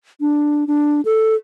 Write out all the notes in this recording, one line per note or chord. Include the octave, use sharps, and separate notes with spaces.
D4
D4
A4